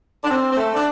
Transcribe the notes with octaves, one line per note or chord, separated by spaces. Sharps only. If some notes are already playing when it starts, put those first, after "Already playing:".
D4
C4
C4
A3
D4